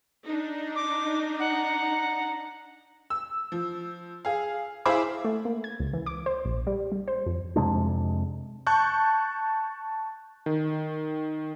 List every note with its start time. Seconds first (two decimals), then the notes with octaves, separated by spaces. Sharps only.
0.25 D4 D#4
0.76 D6
1.40 F#5 A#5
3.10 E6
3.52 F3
4.25 G#4 F5
4.86 E4 G#4 C5 F5 B5 D6
5.25 A3
5.45 A#3
5.64 G#6
5.80 C#2
5.93 E3
6.06 D6
6.26 C5
6.45 A#1
6.67 G3
6.92 G3
7.08 C5
7.26 F2
7.56 F2 C3 G#3 D4
8.67 A5 C#6 F#6 G6
10.46 D#3